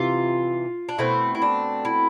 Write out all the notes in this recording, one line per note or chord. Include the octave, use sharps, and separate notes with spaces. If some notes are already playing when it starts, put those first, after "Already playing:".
Already playing: C3 E3 F4
D4
B2 A3 C4 E4
E4
D4
E4